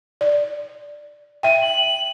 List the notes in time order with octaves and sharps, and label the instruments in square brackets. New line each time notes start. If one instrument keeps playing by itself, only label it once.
[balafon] D5
[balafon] E5 G5 [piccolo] D#7
[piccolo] F#7